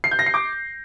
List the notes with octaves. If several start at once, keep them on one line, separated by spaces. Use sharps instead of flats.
C7
G6
A#6
C7
D6